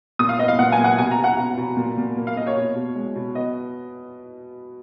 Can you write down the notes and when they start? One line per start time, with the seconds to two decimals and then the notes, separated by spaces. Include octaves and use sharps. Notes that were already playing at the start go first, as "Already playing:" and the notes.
0.19 A#2 D#6
0.29 F5
0.39 B3 D#5
0.48 F5
0.59 A#2 F#5
0.72 G#5
0.78 A#2
0.84 F#5
0.98 B2 G#5
1.11 A#5
1.18 B2
1.24 F#5
1.37 B2
1.57 B2
1.77 A#2
1.98 A#2
2.17 A#3
2.27 F5
2.36 A#3 D#5
2.47 C#5
2.56 B2
2.75 B2
2.96 G#3
3.16 B2
3.35 B3 D#5